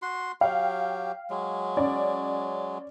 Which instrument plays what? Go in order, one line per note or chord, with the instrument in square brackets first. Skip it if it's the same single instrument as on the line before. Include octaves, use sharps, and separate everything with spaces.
[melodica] F#4 C6
[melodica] F#3 G4 [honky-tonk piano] F5 G5
[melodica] F#3 G#3
[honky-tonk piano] C#4 D5